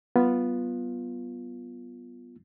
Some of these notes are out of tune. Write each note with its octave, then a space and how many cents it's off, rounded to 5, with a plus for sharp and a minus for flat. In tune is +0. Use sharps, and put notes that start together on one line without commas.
G3 -45 B3 -5 F4 +0